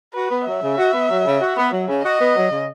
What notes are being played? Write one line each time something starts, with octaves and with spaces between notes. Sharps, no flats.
F#4 B4
B3
F#3 E5
C#3
F#4
B3
F#3
C#3
F#4
B3
F#3
C#3
F#4 D#5
B3
F#3
C#3